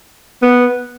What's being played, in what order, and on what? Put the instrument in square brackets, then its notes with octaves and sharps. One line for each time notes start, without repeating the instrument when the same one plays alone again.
[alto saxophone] B3